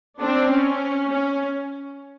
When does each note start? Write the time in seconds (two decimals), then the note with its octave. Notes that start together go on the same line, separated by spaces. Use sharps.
0.21 C4 D4
0.50 C#4
1.11 C#4